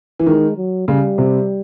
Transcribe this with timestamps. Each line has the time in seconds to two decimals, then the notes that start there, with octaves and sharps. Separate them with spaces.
0.19 E3
0.26 D#3 G#3
0.57 F#3
0.88 C#3 G3
1.18 C3